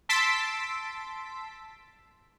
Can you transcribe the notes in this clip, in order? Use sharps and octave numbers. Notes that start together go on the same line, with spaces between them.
A5 C6 E6 A6 B6 D7